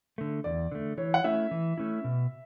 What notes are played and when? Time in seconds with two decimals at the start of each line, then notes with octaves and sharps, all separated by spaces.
0.18 D3 A3
0.44 E2 D5
0.72 D3 A3
0.98 E3 C#5
1.14 F#5
1.24 A3 C#4 E4 E5
1.51 E3
1.78 A3 C#4 E4
2.04 B2